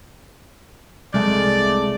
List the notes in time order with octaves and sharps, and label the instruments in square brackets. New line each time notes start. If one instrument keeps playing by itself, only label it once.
[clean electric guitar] C2 A3 [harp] G#3 [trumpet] D5